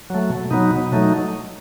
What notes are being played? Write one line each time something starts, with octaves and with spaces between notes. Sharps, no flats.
F#3 A3
B2
F#3 B3 D#4
B2
F#3 A3 D#4